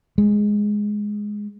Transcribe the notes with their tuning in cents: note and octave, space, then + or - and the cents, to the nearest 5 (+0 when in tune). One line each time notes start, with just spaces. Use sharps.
G#3 +0